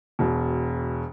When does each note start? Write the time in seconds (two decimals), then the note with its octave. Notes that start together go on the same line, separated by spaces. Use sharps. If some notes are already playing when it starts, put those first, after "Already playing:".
0.19 E1 B2